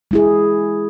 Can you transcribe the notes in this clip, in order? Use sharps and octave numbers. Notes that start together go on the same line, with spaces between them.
G#3 E4 G#4